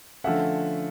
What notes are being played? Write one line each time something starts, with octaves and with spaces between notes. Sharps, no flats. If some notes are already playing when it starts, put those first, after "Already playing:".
D3 F3 A3 C#4 E5 F#5